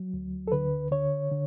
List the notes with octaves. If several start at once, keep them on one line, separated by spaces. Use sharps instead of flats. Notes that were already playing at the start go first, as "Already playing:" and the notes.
Already playing: F#3
D2
A4
D3 B4
D3 C#5
D3